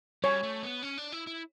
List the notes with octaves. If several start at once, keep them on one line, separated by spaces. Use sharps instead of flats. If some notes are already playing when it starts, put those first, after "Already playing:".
G3 C#5
A3
B3
C#4
D4
E4
E4